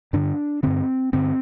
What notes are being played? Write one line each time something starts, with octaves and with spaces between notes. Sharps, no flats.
G2 D3 D4
G2 D3 C4
G2 D3 C4